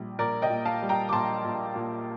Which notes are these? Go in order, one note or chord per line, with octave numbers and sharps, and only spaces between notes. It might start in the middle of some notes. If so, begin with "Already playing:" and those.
Already playing: A#1 G3
A#1 A#4 D5
D#5 G5
A#2
F5 A5
G3
G5 A#5
D6
A#1 A5 C6
A#1
A#2